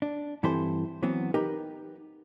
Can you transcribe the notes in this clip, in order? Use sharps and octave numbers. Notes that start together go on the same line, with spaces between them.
D4
G2 E3 C4 E4 A4 C5
E3 F#3 B3 C4
D#4 G4 A#4 B4